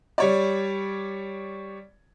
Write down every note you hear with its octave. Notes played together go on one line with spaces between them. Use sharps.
G3 C#5 D5